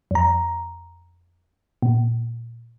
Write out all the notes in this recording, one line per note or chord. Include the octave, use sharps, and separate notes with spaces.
F2 A#5
A#2